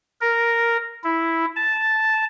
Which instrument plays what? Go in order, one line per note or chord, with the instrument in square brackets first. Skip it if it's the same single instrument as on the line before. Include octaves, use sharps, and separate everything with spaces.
[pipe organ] A#4
E4
A5